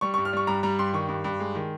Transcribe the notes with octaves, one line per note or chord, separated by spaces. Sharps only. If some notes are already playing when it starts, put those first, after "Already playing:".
G3 C#6
C#6
G2
F6
G3 C#6
G2 A#5
G3 A#5
G2 C6
D#3 C#6
G2
G2
G#3
D#3